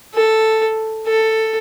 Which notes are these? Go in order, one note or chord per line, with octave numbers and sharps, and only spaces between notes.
A4
A4